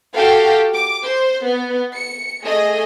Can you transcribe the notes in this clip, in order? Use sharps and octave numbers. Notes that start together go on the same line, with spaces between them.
F#4 G4 A4 F5 G5
D6
C5
B3
C#7
A3 G#4 D#5